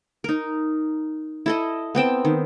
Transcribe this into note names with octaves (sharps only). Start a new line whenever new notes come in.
D#4 A#4
E4 A4 D#5
B3 C4 G5 A5
D#3